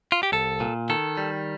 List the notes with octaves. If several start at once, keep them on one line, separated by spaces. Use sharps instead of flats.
F4
G4
C2 A4
A#2
D#3 A4
G3